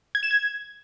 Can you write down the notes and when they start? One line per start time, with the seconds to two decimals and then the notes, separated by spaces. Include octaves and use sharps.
0.15 G#6
0.23 E7
0.31 G#6